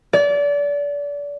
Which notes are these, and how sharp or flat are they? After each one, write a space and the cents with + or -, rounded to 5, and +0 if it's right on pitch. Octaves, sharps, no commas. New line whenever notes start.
D5 -30